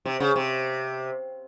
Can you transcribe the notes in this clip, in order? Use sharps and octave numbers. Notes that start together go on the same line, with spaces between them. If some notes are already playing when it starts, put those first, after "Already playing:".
C3
C#3
C3